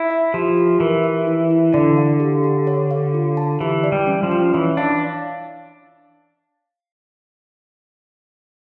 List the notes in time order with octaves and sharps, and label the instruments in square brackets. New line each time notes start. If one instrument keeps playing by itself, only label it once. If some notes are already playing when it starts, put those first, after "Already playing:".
Already playing: [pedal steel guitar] E4
[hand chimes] E5
[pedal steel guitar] F3 [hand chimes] G4
[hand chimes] G4
[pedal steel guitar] E3 [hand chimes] A#4
[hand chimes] E5
E4
E4
[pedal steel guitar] D3 [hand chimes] D5
[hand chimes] F5
G4
G4
C#5
F5
F4
A5
[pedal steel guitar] E3 [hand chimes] G4
[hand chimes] D5
[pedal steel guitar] G3
[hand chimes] C#4
[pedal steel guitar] F3
[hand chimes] C#4
[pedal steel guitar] E3 [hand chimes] C#5
[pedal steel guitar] D4 [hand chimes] F5